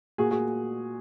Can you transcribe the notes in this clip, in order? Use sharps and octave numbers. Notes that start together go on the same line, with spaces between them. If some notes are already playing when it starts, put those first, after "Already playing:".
A#2 F#4 G#4
F#4 G#4